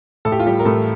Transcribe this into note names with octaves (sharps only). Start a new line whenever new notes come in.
A2 A4
G4
F4
G3 G4
A#4
A2 A3 A4